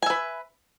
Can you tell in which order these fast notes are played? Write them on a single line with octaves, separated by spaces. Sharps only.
G#5 E5 B4